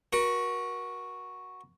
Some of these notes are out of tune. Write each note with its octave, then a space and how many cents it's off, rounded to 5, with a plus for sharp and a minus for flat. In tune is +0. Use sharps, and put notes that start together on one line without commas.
F#4 -5 A#4 +40